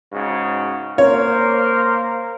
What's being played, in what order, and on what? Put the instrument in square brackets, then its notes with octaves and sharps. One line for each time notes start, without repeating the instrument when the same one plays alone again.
[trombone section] G#2 C#3 F#4
[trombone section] A#3 A#4 C5 [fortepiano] C#5